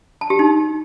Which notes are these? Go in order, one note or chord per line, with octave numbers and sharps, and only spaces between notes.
A5
G4
D#4